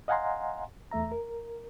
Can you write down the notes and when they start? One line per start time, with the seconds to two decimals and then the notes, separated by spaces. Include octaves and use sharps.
0.08 D#5 F5 F#5 G#5 A#5 C6
0.91 E2 A3 E5 A#5
1.12 A#4